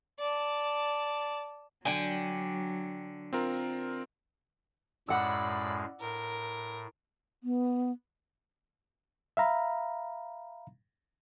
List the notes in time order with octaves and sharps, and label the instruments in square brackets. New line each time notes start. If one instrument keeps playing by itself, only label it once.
[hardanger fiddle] D5 A5
[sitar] D3 [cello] F#3 [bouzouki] G5 G#5
[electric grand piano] C4 F4 A#4
[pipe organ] F#2 A2 G#3 [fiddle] D5 B5 [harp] F#5 E6
[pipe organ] A2 [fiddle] A#4
[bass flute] B3
[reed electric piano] E5 F5 A#5 B5